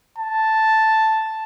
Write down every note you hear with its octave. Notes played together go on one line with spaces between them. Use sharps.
A5